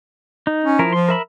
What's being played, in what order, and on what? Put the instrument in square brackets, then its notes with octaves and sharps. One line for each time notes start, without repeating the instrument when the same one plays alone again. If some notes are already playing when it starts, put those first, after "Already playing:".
[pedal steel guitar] D#4
[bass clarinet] C#4
[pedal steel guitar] F3 E4 A#4
[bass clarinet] F3 [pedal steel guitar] C6
[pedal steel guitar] A#4 E5 B5